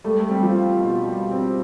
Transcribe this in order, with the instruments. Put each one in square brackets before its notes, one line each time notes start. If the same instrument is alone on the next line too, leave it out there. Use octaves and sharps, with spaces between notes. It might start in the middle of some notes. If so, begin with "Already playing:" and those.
[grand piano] G3 [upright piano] A3
[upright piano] A3
[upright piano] G3 [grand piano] C4
[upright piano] F3
[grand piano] F4
B2
G3
C4